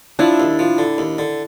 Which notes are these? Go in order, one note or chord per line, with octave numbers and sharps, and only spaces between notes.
F3 D4 E4
D#2
F3
D3
D#2
D3